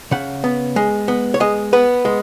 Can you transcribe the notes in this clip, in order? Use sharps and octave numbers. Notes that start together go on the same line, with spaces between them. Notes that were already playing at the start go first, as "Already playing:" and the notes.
C#3 F#5
B3
G#3
B3
C#5
G#3 D#5
B3 B4
G#3